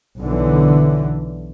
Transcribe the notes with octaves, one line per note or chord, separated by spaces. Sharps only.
B1 D3 E3